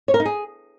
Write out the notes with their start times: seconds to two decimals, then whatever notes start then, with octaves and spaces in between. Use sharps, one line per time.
0.08 C#5
0.14 A#4
0.20 D#4
0.25 G#4